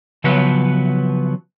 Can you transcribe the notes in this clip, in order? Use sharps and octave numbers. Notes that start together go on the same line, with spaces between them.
C#3 F3 F#3 B3 B4